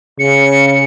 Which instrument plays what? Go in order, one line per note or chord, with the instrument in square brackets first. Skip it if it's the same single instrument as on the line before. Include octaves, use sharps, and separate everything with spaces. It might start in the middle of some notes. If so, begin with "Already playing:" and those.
[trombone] C#3 [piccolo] C#7